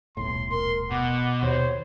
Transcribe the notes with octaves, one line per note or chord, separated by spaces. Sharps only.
D#1 B1 A2 C6
A#4 C6
B2 F#5 D6
D#2 C5 C#5